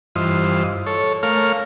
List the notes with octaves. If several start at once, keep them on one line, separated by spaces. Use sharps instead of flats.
G2 E3 F4 C5 D#5
A4 C#5
A3 A#4 C#5 F5 F6